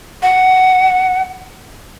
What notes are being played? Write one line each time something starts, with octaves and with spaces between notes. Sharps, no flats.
F#5